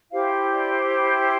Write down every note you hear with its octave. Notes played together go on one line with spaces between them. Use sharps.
E4 G4 C5 F5
D5